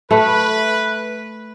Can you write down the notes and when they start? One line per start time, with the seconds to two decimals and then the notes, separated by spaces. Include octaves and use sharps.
0.11 A3 B4